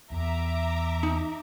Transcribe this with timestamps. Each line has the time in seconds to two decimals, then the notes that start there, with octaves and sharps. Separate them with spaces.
0.11 E2 E5 A#5 D6
1.03 D#4